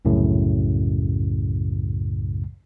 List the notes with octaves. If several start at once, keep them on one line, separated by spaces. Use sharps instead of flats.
C2 F#2 A2 C#3